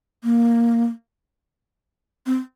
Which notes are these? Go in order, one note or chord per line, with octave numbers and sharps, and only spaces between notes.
A#3
C4